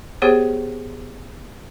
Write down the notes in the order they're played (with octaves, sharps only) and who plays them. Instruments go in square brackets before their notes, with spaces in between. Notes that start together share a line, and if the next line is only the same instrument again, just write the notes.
[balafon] B3 G4 G#4 C5 C#5